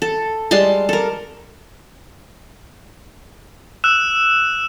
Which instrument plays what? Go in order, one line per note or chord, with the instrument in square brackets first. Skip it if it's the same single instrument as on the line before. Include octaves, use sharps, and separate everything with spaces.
[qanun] A4
G3 G#3 A5 C6
A4 A#4
[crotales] E6 F#6 E7